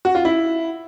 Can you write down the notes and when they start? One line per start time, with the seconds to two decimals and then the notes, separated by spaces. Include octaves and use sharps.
0.05 F#4
0.15 F4
0.25 E4